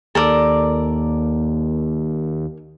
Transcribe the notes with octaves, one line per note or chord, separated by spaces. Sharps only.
D#2 A4 A#4 D5